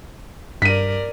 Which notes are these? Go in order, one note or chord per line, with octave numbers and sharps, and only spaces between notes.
G2 A#4 D5 B6 D#7